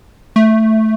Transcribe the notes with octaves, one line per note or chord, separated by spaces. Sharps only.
A3